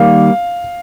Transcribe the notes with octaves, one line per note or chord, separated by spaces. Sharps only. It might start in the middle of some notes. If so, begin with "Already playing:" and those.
Already playing: D#3 G3 A#3 F5